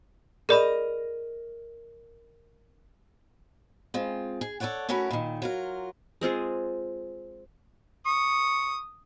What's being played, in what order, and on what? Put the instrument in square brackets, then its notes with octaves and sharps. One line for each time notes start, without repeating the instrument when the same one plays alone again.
[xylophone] G#4 D5 B5 [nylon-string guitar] A#4 D#5
[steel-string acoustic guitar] G#3 C4 F4
G#4
A4 B4 C#5 D5 F#5
A3 C#4 E4 F#4 A#4 B4
A#2 D#3
F#3 F4 A#4
[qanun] G#3 C4 F4 G#4
[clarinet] C#6 [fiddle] D#6